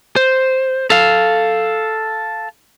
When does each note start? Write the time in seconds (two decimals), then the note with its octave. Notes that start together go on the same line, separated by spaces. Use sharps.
0.16 C5
0.90 A4 F5